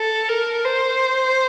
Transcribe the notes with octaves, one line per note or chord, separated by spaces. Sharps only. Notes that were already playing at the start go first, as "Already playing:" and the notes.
Already playing: A4
A#4
C5